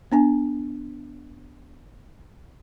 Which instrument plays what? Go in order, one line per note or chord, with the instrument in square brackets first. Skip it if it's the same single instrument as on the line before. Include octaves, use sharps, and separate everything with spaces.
[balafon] B3 D4 G#5